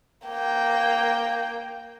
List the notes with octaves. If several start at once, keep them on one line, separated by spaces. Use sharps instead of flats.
A#3 G5